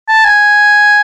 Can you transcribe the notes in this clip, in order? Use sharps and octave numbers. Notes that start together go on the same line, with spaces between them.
A5
G#5